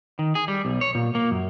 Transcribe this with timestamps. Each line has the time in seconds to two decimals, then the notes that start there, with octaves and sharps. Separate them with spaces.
0.19 D#3
0.35 G#4
0.48 G3
0.65 B1
0.81 C#5
0.95 A#2
1.15 A#3
1.31 F#2